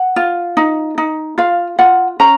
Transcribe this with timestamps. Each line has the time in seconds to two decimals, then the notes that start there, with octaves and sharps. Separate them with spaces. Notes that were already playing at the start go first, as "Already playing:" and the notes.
Already playing: F#5
0.16 F4
0.57 D#4
0.98 D#4
1.38 F4 F5
1.79 F4 F#5
2.20 C#4 A#5